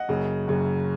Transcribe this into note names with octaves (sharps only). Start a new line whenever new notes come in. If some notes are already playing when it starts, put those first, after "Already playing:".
Already playing: D#5 F#5
F#1 F#2 C#3
F#1 F#2 C#3